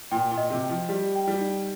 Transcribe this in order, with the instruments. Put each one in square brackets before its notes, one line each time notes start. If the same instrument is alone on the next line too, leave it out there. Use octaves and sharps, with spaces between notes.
[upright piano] A#2 [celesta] G5
[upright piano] A#2
[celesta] D#5
[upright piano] C3
[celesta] G5
[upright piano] F3
[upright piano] G3 [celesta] G4
[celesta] G5
[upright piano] G3
[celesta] D#4